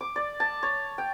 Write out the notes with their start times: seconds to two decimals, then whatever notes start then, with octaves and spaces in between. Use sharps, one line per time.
0.01 D6
0.16 D5
0.40 A5
0.63 C#5
0.98 G5